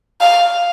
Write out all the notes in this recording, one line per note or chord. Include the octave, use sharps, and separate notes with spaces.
F5